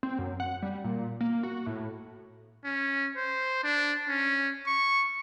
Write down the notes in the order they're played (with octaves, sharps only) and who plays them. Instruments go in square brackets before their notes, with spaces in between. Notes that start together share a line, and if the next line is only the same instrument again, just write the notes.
[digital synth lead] C4
F#2
F#5
G3
A#2
A#3
F#4
A2
[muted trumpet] C#4
C5
D4
C#4
C#6